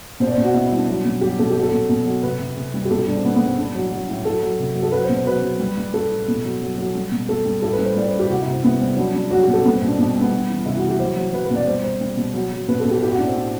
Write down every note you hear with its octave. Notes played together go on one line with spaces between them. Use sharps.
B2 C5
D5
C5
B2
F#4
B2 E4
E4
G3
D4
F#3
B2
F#3 G4
B2 A4
F#3 G4
A4
B2
B2
F#3
C3 B4
C3
C3
G3
G4
B2 A4
G4
G3 D4
C4
B2 B3
B3
G3
C4
A2 D4
F#3
F#3
A2
F#3 A4
F#3
C3
F#3
A4
F#3 B4
C5
B2
C5
F#3 B4
F#3
G3
G3
G3 A4
A2
B2
F#3
F#3
F#3
G3
B2
G3 A4
G3
A2 A4
B4
G3
C5
G3 D5
C5
A2
G4
C3 F#4
E4
C3
C4
G3 B3
G3 C4
F#3 D4
F#3 D4
F#3 F#4
G4
B2
A4
G3 B3
C4
B2
D4
B2 D4
C4
G3
B3
G3
E3
C3 E4
F#4
E3
G4
F#3 C5
F#3
F#3 B4
B4
B2 D5
G3 C5
G3 C5
G3
B2
F#3
F#3
B2 B4
A4
B2
G4
A2 G4
F#4
A2 D4
C4
A2